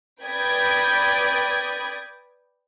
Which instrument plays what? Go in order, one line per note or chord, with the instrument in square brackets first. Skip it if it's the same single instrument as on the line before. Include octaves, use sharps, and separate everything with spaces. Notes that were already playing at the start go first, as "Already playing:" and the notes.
[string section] B4 D5 G5 B5 D#6 G#6